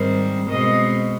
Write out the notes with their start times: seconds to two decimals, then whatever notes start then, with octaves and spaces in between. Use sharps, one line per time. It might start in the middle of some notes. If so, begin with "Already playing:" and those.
Already playing: G#2 D#3 G3 C4
0.49 B2 G#3 C4 D#5